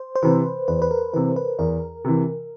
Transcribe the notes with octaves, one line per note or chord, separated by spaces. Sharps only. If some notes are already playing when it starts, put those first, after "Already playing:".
Already playing: C5
C5
C3 E3 B4
E2 B4
B4
A#4
C3 E3 B4
B4
E2 A#4
C3 E3